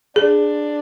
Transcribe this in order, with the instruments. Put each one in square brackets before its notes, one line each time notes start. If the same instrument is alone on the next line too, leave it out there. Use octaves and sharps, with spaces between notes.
[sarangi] D4 [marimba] G#4